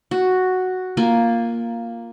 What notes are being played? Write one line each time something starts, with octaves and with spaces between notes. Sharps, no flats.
F#4
A#3 F4 G#5